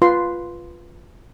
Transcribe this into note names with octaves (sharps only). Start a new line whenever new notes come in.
F4 B4 C6